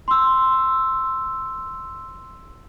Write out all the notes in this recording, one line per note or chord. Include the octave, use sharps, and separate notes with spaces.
C6 E6